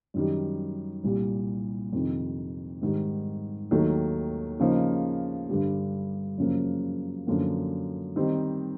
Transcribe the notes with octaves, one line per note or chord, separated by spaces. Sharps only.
F#2 D#3 G3
C2 A#2 G3
F2 C3 D#3
G#2 D#3 G3
D#2 D#3 F#3 A3
C#3 F3 A#3 D#4
G2 D3 G3
F#2 C#3 F3 A#3
F#2 D3 F3 A#3
D#3 G3 C4 D#4